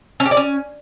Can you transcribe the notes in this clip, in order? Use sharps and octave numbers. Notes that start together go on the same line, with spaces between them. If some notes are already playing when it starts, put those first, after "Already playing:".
C#4
G4
D5
C#4